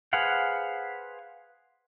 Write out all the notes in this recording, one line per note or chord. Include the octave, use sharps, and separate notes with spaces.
G#4 B4 C5 F5 F#5